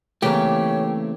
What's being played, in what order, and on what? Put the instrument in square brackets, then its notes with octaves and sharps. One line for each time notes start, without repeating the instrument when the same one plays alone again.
[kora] C#3 E3 A#3 [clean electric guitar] A3 C4 [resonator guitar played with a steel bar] G4 [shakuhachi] C#5